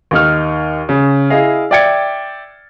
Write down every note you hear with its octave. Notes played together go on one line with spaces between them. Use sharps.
D#2 D#4 F6
C#3
E4 G#4 D#5 F5
D5 E5 G5 G#6 A6 C#7